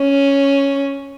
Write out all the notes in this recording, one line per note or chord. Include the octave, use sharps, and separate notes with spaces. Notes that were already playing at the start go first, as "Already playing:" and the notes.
Already playing: C#4